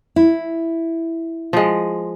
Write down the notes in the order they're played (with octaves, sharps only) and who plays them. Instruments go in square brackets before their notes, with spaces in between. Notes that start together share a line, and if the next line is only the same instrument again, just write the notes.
[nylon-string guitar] E4
[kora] F3 G#3